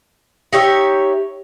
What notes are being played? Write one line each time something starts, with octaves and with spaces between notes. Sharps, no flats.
D#4 G4 C#5 E5